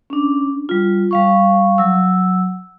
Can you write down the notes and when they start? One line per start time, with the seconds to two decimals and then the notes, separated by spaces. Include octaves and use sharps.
0.10 C#4 D4
0.69 G3 F4
1.11 G3 F5 C#6
1.78 F#3 E6